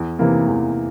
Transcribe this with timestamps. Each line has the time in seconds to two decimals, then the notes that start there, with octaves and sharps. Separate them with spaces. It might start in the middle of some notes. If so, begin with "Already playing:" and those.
Already playing: E2
0.19 C3 E3 A#3
0.47 E2